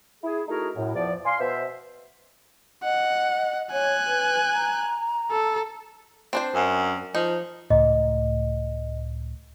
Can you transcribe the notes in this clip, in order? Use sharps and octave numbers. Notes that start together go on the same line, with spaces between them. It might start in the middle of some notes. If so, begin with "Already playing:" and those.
E4 G#4
A3 D#4 E4 F#4 G#4 A#4
F#2 A2
E2 F3 D5
D5 F5 G#5 C6
B2 C5 E5
D#5 F#5
C#5 G#5 F#6
B4
A#5
A4
C4 D4 C5
F#2
F3 D#4
C#2 A2 D#5